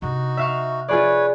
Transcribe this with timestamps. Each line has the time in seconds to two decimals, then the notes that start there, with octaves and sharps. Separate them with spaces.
0.02 C3 D4 D#4 F#4
0.37 E5 F5 C#6
0.89 F4 G#4 B4 C#5 D5